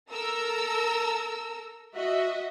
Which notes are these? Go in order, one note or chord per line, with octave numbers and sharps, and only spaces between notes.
A4 A#4 A#5 E6
F#4 D#5 E5